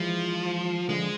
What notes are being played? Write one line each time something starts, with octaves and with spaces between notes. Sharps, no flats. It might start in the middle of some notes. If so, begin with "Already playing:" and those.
Already playing: E3 F3 G#3
D3 F3 G#3